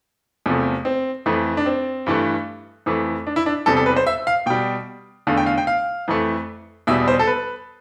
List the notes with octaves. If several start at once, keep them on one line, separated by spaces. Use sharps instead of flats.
E2 C3 F3 A3
C4
F2 E3 A3
D4
C4
G2 E3 A3
F2 E3 A3
D4
E4
D4
E2 C3 G3 A4
A4
B4
C5
E5
F5
B2 G3 G5
E2 D3 A3 F5
G5
F5
G5
F5
F2 E3 A3
E2 B2 G3 E5
C5
A4
B4